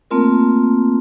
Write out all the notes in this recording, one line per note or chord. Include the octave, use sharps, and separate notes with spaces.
A3 A#3 C4 F4 A#4